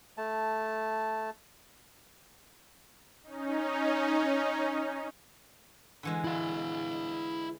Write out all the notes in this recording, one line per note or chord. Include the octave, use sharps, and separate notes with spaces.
A3 A5
C#4 D#4
D3 E3 G#3
E4 F5